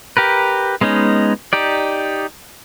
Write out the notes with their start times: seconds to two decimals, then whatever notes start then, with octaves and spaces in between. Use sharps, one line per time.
0.17 G4 A#4 B4
0.81 G#3 B3 C#4 D#4
1.53 D#4 G4 D5